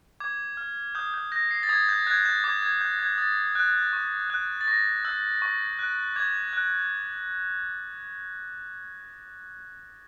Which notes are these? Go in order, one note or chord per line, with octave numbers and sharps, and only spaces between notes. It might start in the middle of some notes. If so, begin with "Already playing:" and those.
D6 G#6
F6
D#6 G6
G6
G6 A#6
C7
A6
D#6 G#6
G6
F#6 G#6
G6
D6 G#6
G#6
G6
G#6
D#6 A6
F#6
C#6
F#6
A6
C#6 A#6
E6 G6
C#6
F#6
D6 G#6
F#6